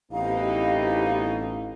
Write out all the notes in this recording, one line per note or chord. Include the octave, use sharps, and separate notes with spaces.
A1 B2 C4 D#4 E4 G4 F5